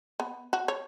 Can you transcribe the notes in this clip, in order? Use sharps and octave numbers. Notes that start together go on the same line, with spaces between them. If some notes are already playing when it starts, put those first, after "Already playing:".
B3
F#4
C#5